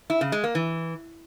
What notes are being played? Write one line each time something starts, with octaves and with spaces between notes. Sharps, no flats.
E4
C#3
G#3
A#3
E3